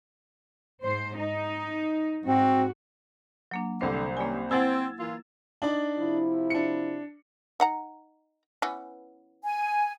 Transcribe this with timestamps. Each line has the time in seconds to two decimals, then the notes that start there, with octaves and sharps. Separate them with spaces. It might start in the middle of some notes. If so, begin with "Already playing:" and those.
0.85 G#2 C5
1.18 D#4
2.26 G#2 C4 F#4
3.51 F#3 A#3 D4
3.81 C2 D3 D4 C5 C7
4.17 D#3 G3 A#3 C#4 G#5
4.51 C4 E4 F#5 G#5 E6 G#6 A6
5.00 E3 A#3 F4
5.62 D4 D#4 D5
5.98 C3 F3 E4
6.50 D4 C#7
7.60 D#4 F#5 A#5
8.62 E3 B3 C#4
9.44 G#5